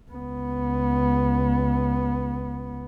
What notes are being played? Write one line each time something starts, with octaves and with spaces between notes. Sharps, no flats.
C#2 B3